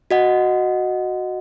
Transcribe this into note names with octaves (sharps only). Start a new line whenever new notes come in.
F#4 D#5 F#5